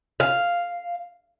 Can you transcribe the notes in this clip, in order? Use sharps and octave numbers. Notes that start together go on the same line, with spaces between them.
F5